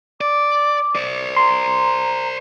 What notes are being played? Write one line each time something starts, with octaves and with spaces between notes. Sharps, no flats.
D5 D6
C5 D5
A#5 C6